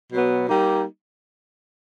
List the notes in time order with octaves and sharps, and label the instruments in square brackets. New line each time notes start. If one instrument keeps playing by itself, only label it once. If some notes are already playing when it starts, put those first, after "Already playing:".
[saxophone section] B2 F#3 B3
G3 A#3 D#4